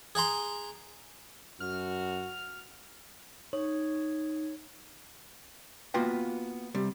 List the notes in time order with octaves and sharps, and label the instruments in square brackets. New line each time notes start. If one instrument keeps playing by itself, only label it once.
[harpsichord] G#4 F#5 A#5 C6
[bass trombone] F#2 [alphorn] F#4 [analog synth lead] F6
[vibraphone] D#4 [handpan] C#5
[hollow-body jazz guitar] A#3 B3 F4 F#4 B4 G5
C3 G3